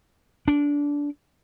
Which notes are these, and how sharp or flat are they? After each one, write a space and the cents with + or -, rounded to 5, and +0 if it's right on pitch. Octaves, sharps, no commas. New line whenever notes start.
D4 -20